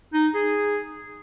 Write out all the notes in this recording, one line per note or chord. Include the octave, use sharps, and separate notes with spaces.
D#4
G#4